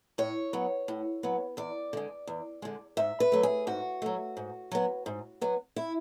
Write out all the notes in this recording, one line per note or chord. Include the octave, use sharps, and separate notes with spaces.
A2 C#5
F#3 B3
A2
F#3 B3
E2 D5
D3 G#3
E2
D3 G#3
G#2 E5
B4
F#3 A3
G#4
G#2 F#4
F#3 A3
G#2
F#3 B3
G#2
F#3 B3
E4